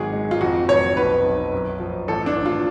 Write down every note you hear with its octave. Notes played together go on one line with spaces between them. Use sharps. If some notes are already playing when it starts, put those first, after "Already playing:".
Already playing: G#1 F#3 G#4
G#3
F4
F2 F#4
F1 C#5
B1 B4
B1
F#2
F3
A1 A4
D4
A1
F4